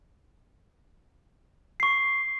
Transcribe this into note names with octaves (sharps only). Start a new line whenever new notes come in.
C#6 C7